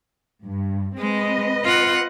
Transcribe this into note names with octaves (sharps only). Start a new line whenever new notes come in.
G2
G#3 C4 B4 D#5
F4 F#5